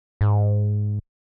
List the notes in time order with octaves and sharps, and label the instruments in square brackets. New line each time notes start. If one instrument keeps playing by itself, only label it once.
[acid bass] G#2